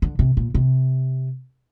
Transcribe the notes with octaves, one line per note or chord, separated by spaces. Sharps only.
D3
C3
A#2
C3